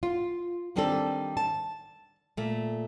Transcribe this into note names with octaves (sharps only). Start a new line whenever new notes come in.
F4
D#3 G3 C4 D4 G4 A4
A5
A#2 A3